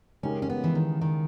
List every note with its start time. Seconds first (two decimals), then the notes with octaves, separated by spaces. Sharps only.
0.23 C#3 G#3 C#4 D#4 G4 A#4
0.42 C#4
0.50 B3
0.64 E3
0.75 D#3
1.01 D#3